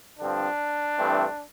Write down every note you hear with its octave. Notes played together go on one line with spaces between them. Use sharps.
G2 D3 F3 C4 D4
G2 E3 A3 C4